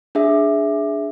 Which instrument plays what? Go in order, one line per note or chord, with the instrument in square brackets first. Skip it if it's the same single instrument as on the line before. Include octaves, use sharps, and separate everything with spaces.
[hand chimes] D4 G#4 E5